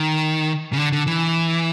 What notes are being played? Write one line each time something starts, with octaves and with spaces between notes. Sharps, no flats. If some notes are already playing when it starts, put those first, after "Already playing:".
Already playing: D#3
C#3
D3
D3
E3